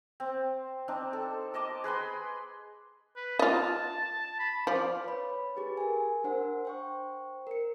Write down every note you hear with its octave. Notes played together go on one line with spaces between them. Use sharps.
C4
C4 D4 D#4
A4
A#4 D#5 A5 D6
G#4 B4 B5 C6
B4
F4 D#5 A5
B5
F3 D5
B4 C#5 B5
G4 G#4 B4
A#4 G#5
D4 A#4 C5 F#5
C5 G5 C#6
A#4 C#7